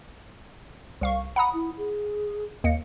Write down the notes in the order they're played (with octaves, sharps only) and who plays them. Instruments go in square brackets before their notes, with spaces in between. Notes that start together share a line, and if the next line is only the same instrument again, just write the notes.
[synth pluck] C2 F5 C#6
[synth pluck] F#5 A#5 D#6 [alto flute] B5
[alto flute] E4
G#4
[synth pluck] D#2 A#3 C#7